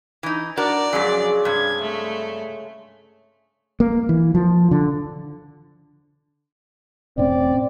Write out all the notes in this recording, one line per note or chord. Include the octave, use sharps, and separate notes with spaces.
E3 D#4
D4 F#4 A#4 D5
F2 C#3 F#3 G#3
G2 C3 G#6
A3
A#3
E3
F3
D3
E1 A2 C4 C#4 D5